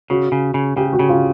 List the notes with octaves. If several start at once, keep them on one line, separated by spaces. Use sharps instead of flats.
C#3 F#4
C#3
C#3
C#3 G4
F#4
C#3
F4